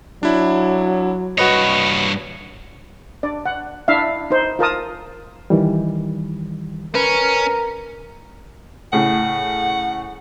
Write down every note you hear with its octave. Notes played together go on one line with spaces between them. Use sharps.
F#3 D4 E4
G2 F#4 B4 C#5 D#5
D4 D5
F#5
D4 E4 E5 F5
D#4 C5
F4 A#4 A5 D#6
D#3 E3 G3
C#4 A#4 B4
A2 C#3 F#5